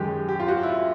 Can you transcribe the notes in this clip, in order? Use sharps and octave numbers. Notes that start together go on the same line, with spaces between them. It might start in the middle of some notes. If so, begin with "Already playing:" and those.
Already playing: F#2 D#3 G#3 G4
G4
F4
F#4
E4
F4